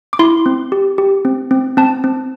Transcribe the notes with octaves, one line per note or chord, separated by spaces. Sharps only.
D6
E4 C6
C4
G4
G4
C4
C4
C4 A5
C4